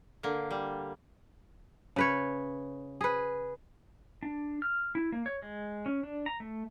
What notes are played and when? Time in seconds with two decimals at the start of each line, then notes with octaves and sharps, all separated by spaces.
0.23 D3 A#3
0.51 G3
1.96 C#3 B4 C#5
3.01 G#4 B4
4.23 D4
4.62 F6
4.95 E4
5.12 A#3
5.26 C#5
5.42 G#3
5.86 C#4
6.03 D4
6.26 A#5
6.40 A3